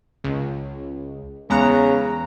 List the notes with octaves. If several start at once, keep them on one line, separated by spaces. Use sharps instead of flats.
C#2
E2 C#3 G#3 B3 A#5